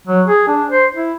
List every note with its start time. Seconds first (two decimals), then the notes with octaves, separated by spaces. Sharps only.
0.07 F#3
0.27 G#4
0.48 D4
0.70 C5
0.94 E4